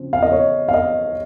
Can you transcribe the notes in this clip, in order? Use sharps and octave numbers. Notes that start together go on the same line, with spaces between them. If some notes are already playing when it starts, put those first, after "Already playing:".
Already playing: C#3 F3 C4
F5
D#5
C#5
F5
D#5